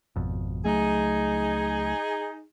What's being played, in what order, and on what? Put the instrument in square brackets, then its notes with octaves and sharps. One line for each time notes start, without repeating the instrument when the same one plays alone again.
[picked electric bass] G#1 F2 B2
[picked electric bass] C#2 F#3 A3 [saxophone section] D#4 G#4